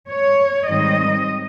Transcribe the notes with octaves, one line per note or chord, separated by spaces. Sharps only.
C#5
G#2 D#3 G3 C4 D#5